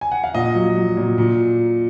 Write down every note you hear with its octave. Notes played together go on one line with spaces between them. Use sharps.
G#5
F#5
F5
A#2 D#5
F#3
F#3
A#2
A#2